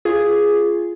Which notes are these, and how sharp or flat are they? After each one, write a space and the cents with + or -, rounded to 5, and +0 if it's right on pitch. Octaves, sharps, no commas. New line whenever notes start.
F4 -15 G#4 +0